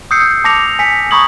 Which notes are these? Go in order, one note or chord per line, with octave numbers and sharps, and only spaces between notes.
D#6 E6 G6 C7 C#7
A5 D6 A#6 C#7 F7
G#5 B6 C#7
A#5 B5 C#6 D#6 G#6 F#7